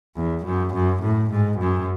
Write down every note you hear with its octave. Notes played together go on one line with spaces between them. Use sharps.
E2
F#2
F#2
A2
G#2
F#2